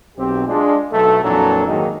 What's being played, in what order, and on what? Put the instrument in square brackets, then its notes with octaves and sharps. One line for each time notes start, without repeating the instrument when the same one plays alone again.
[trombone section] B1 C4 G4
G#3 D4 F4
B1 A3 A4
F2 A#2 E3 F#3 D4 A4
G#2 D#3 F#3 G#3 A#3 D#4